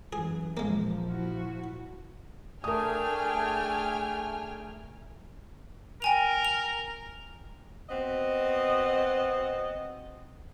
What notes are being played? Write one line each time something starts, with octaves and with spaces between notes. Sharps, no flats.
F#2 E3 G#4
A#1 F3 G#3 A#3
E4 F#4
A3 D4 G#4 A#4 G5 G#5 D#6 F6
A#4 G5 G#5 F7
F7
B3 C4 F#4 D#5